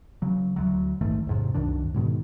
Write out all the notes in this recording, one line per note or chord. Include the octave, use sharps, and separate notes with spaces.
C#3 F#3
D2 F#3
A#1 G#2 D#3 A3
E2 G#2 C3
C2 F#2 D#3 D4
G#2 B2 D#3